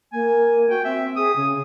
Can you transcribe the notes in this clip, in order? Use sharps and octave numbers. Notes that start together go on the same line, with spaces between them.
A#3 G#5
F#4 G5
C4 E5
G#4 D#6
C#3